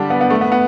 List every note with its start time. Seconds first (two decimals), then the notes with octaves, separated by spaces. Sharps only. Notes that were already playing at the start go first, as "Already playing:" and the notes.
Already playing: D3 G3 D4 G4
0.10 B3
0.21 B3
0.30 A3
0.41 B3
0.52 B3